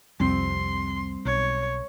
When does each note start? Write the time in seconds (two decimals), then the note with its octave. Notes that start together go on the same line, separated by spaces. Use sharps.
0.20 C2 F2 G3 C4 C6
1.25 B1 C#5